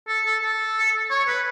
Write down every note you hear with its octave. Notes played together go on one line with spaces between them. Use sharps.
A4
A4
A4
C#5
B4